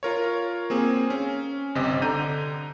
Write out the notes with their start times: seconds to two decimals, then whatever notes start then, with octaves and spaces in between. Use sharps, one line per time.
0.03 F4 A#4 C#5
0.70 A#3 C4 G#4
1.10 C#4
1.75 G1 C3 G4 D#5
2.02 D3 A#5 G6 D#7